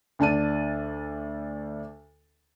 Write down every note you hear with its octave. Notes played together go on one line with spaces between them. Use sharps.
D2 D4 A5 D#7